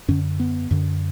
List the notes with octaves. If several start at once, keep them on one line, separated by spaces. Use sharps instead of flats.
F#2 D3 C#4
B3
F#2 D3